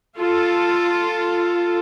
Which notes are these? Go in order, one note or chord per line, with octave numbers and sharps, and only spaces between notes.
F4 A4